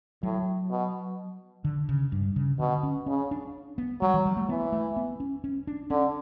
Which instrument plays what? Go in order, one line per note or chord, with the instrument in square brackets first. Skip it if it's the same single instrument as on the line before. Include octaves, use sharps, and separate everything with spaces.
[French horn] A2 [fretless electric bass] F#3
[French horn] B2
[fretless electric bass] D3
C#3
G2
C#3
[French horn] B2 [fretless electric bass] D3
[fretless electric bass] C#4
[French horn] C#3 [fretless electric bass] C#4
[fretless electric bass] D4
B3
[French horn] F#3 [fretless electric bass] G3
[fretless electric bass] E3
G3
A3
[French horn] E3 [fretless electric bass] B3
[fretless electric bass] A3
B3
C#4
C#4
D4
[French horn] D3 [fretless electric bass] C#4